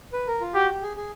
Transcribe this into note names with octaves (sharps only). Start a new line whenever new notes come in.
B4
A#4
F4
F#4 G4
G4
G#4
G#4